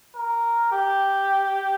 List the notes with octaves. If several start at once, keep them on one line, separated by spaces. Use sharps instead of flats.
A#4
G4